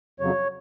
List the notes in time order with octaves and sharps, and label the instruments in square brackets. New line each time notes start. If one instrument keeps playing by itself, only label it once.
[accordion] F2 C#3 F#3 C#5